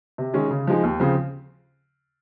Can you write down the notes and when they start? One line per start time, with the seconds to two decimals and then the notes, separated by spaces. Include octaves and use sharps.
0.18 C3
0.34 D#3 G#3 C#4
0.51 C#3
0.67 F3 G#3 D#4
0.83 D#2
1.00 C#3 F3 C4